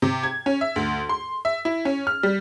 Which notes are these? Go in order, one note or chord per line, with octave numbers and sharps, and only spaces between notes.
C3
G#6
C#4
E5
D2
C6
E5
E4
C#4
F6
G3